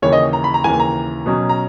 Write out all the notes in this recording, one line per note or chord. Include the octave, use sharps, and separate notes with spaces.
D#2 C#3 E3 C#5
D#5
A#5
B5
A#5
D#2 C#3 E3 G#5
A#5
B2 F#3 C#4
A#5